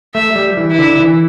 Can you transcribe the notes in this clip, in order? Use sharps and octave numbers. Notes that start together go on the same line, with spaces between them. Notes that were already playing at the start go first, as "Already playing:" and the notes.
A3 E5
G3
E3
E4
D3
E3